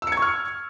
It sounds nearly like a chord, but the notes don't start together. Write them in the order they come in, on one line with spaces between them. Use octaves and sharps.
E6 C#7 G#6 C#6 F6